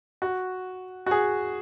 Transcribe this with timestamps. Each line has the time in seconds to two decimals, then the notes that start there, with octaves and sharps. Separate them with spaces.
0.22 F#4
1.06 F#4
1.11 G#4